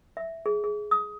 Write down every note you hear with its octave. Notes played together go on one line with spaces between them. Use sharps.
E5
G#4
G#4
D#6